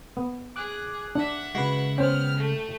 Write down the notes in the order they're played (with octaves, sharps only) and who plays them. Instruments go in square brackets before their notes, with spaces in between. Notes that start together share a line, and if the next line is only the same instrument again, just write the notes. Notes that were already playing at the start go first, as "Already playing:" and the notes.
[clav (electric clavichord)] B3
[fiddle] G#4 [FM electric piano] D6 F#6
[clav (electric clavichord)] D4 [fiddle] E5 F#5
[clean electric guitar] C#3 G#3 [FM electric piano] F#4 B4
[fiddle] B3 F6 [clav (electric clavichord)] C#4 C5 [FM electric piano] G5
[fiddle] A3